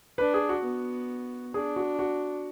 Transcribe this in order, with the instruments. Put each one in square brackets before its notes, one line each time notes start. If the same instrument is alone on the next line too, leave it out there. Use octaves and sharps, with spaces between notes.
[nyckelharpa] D4 [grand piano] B4
[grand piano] G#4
F#4
[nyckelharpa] B3
[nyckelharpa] D4 [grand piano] G#4
[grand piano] F#4
F#4